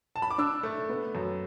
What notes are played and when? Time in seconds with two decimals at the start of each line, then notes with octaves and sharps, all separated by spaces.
0.16 A5
0.22 B5
0.30 D6
0.38 D4 E6
0.63 A3
0.89 B3
1.15 F#2